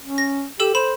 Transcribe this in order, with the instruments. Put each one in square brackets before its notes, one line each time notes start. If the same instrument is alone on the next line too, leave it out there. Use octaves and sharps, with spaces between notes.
[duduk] C#4
[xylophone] A#6
[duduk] G4 [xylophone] A4 E6 E7
[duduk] C5 [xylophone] B5 E7